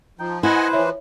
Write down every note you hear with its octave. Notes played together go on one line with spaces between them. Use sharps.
F3 D#4 G5
E4 B4 C5 D#5 F#5 G#5
E3 F3 C#5 E5